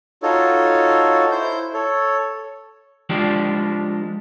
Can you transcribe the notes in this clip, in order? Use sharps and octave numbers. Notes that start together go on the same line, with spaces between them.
D#4 F4 F#4 A4 C#5
E4 C5 G6
A4 C#5
F3 G#3 D4 G4